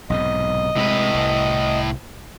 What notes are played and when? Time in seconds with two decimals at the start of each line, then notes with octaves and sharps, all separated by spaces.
0.10 B1 G#2 C3 D#5
0.76 A2 C3 G#3 B4
1.15 C2